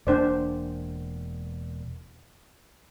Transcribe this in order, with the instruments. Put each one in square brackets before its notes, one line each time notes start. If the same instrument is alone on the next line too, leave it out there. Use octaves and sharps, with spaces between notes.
[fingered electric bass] E1 A#3 [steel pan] D4 C5 D5